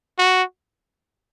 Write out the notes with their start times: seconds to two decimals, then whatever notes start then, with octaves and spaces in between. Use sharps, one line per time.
0.19 F#4